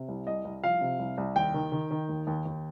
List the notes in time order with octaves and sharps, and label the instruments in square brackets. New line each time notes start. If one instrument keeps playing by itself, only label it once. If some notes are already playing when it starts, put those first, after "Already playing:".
Already playing: [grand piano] C3
C2
C2 D#5
C2
F3 F5
C3
C2
C2
D#2 G5
D#3
D#3
D#3
D#2
D#2
D#2